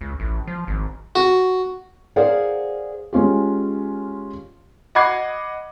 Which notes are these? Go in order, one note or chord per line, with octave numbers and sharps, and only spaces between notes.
C#2
A1
F3
G#1
F#4
G#4 A#4 C5 D5 F5 F#5
G#3 C#4 F4 G4
D#5 F#5 B5 D6 G#6 C7